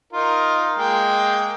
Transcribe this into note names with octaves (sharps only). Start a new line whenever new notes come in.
D#4 F4 A#4
G#3 A#3 G5